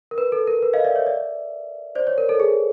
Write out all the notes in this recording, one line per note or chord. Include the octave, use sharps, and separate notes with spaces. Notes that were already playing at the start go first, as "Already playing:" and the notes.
A#4
B4
A4
A#4
B4
D#5 F5
D5 E5
C#5 D#5
D5 E5
C5 D5
C#5
A#4
A4
G#4